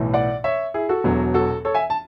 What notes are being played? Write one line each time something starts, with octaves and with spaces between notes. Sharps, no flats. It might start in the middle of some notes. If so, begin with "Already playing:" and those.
Already playing: B1 A2 E3
D5 F#5
C#5 E5
E4 G#4
F#4 A4
E1 E2 B2 F#3
F#4 A4
A4 C#5
E5 G#5
A5